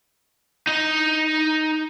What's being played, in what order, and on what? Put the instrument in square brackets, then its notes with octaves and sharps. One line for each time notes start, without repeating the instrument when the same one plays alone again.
[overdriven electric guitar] D#4 D#5